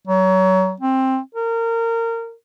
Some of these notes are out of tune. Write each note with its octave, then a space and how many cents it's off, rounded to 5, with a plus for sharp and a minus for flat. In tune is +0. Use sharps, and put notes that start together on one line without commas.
F#3 +25
C4 +10
A#4 -25